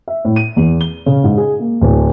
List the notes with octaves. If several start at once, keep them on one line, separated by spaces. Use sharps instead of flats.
E5
A2
D#7
E2
G7
C#3
G#2
G#4
A#3
D1